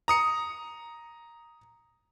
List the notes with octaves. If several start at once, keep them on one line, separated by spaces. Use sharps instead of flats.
A#5 D#6 C#7